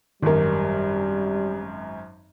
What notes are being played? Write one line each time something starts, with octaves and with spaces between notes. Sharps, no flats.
G#1 F#2 D#3 G3 A#4